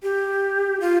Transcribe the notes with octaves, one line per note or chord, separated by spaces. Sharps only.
G4
F4